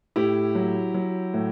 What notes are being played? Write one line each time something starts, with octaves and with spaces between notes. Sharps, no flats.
A2 E4 G4
F#3
F#3
A2